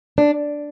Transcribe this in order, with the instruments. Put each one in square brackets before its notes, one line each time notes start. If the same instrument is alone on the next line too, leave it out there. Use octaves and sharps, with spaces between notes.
[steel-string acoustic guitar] D4